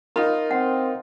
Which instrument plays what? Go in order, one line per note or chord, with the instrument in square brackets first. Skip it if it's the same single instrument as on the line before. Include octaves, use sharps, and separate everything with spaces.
[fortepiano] D#4 F4 [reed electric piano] A#4 [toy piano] B5
[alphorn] C4 [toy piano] F#5